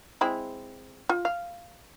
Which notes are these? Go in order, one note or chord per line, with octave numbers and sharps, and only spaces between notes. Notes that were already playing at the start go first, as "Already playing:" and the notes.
G#3 C4 E4
F4
F5